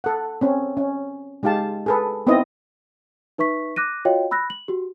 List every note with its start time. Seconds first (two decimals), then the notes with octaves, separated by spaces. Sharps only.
0.04 A4 F#5
0.41 C4 C#4
0.77 C#4
1.43 G#3 D#4 G4 F5 A5
1.86 G#4 A4 B4
2.27 B3 C4 D#4 E4 D#5
3.38 D#4 B4 E5 C#6 B6
3.76 D6 F#6 A#6 D#7
4.05 F4 F#4 C#5 D#5 F5 G5
4.31 B5 E6 F#6 A#6
4.50 F#7
4.68 F#4 G4